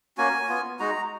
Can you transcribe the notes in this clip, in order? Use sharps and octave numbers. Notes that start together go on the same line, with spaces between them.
A#3 C#4 F#4 G#5
B3 F4
G#3 D#4 F#4 A#5